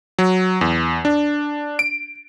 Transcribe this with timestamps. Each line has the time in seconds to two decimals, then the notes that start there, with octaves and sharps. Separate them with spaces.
0.19 F#3
0.61 E2
1.05 D4
1.79 D7